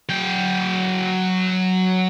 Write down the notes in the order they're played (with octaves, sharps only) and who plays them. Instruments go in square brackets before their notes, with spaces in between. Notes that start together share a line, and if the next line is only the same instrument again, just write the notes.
[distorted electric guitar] F#3 G5